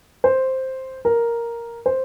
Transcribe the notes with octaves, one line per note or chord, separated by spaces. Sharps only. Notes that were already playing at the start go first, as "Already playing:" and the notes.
C5
A#4
C5